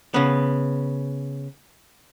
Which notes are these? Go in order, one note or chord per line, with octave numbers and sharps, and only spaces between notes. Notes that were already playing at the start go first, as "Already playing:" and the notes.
C#3 B3